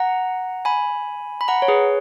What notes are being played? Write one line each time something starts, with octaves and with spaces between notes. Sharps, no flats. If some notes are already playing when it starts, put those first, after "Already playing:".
Already playing: F#5 A#5
G#5 B5
B5
F#5 A#5
C#5
G#4 B4